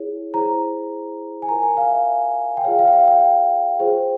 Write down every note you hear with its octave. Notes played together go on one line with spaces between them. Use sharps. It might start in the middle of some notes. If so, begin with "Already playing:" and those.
Already playing: E4 G#4 C#5
E4 G#4 C5 A#5
G#5
F4 A#4 C#5 A#5
G#5
F5
E5
G5
F4 G#4 C#5 F5
F5
G5
F5
F5
G5
F4 G#4 C5